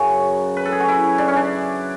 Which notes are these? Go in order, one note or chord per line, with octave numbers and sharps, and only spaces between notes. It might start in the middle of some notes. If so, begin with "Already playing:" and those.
Already playing: F#2 C#3 F#3 F#4
B4
A4
G#4
F#4
E4
D4
C#4
D4